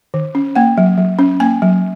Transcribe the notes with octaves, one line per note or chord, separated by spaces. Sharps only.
D#3
C#4
A#3 F#5
F#3
F#3
C#4
A#3 G#5
F#3